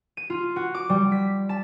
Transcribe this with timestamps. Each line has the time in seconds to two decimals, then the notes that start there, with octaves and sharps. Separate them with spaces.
0.17 D#7
0.30 F4
0.56 F#4
0.74 D6
0.90 G3
1.12 B6
1.49 A5